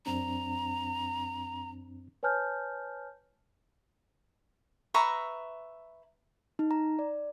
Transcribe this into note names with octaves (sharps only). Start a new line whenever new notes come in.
F#2 C4 D4 A#5
B4 C#5 G#5 A5 F6 G6
B4 E5 A#5 C#6
D#4
A#5
D5